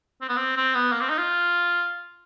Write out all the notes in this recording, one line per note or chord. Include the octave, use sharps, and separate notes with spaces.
C4
B3
C4
C4
B3
A#3
C4
D#4
F4